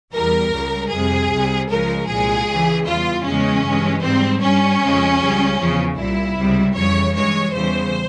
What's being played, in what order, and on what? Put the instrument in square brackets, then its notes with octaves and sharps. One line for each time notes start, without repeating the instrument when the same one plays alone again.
[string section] E2 E3 G3 A#4
C#2 C#3 G3
F2 C3 G3 G#4
C2 C3 G3
C#2 C#3 F3 G#3 A#4
C2 A#2 G#3 G#4
C#2 C#3 E3
E2 E3 G3 F4
E2 C#3 E3 G#3 C#4
G2 E3 G#3
G#2 G3 C4
G2 G3 C#4
F2 C#3 F3 G#3
C#2 C#3 G3
E2 C#3 F3
C2 A#2 G3 E4
C#2 C3 G3
F2 C#3 E3 G3 C#5
G2 E3 G#3 C#5
E2 C#3 E3 G3 C5